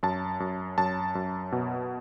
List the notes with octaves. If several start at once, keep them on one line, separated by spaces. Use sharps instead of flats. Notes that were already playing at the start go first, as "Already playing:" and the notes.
F#2 A5
F#2
F#2 A5
F#2
B2